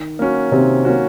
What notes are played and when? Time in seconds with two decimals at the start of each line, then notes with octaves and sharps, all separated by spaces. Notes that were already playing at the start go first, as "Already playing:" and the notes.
Already playing: D#3
0.19 A#3 C#4 F#4
0.51 C3 D#3 C4
0.85 A#3 C#4 F#4